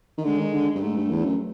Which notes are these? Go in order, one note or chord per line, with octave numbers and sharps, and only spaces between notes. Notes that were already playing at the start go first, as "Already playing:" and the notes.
D#3
D3 G#3
D#3
D3
G2
G#2 A3
G2
E2
F#2